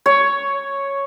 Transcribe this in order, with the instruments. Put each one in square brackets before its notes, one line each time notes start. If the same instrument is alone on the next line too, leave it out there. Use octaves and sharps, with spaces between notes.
[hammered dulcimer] C#5